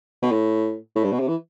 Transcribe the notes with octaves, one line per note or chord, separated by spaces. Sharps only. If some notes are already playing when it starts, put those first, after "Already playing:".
B2
A2
A2
G2
B2
C3
E3